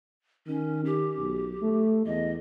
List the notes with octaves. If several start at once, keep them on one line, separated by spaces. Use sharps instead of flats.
D#3 C#4
G4
B1
A3
E2 D#5